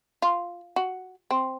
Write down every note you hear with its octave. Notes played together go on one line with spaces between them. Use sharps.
F4
F#4
C4